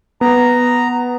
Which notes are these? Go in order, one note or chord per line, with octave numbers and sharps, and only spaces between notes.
B3 A#5